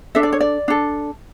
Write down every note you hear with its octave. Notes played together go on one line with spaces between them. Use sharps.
D4 A4 E5
D5
C#5
D5
D4 A4